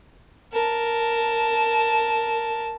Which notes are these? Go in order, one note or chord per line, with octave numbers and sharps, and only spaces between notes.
A#4 A5